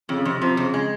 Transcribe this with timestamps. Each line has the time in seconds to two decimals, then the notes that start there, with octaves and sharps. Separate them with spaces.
0.09 F2 C#3
0.25 F2 C3
0.42 C3 F3
0.57 F2 C#3
0.74 G#3